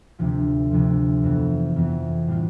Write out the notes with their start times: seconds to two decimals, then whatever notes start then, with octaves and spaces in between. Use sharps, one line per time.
0.19 D2 C3 F3
0.71 D2 C3 F3
1.23 F2 E3 B3
1.76 F2 E3 B3
2.28 A2 G3 B3 F4